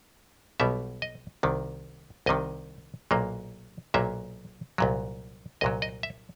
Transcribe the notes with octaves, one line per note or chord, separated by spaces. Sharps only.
B1 B2 G3 B3 E5
D#5
C2 C3 D#3
C2 C3 D#3 D#5
B1 A#2 F#3 A#3
B1 A#2 F#3 A#3 E5
C2 A#2 F#3
C2 A#2 F#3 D#5
D#5
E5